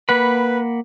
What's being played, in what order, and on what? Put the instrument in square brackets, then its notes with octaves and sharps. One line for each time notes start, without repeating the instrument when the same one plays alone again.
[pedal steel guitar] A#3 F#5 B5 [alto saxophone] B4